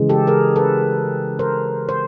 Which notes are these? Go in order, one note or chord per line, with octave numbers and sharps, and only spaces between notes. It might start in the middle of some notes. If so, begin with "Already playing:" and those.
Already playing: C#3 E3 G#3
G4 A4
G#4 A#4
A4 B4
A#4 C5
C5